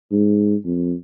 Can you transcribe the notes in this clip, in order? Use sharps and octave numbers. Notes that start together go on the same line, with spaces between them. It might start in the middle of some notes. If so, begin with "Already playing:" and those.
G#2
F2